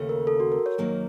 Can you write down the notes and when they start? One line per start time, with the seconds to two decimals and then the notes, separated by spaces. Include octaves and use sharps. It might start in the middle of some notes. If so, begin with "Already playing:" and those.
Already playing: D#2 C#3 A3
0.09 A#4
0.27 A4
0.40 F#4
0.52 A#4
0.66 C#5
0.78 F#2 D#3 F#3 A#3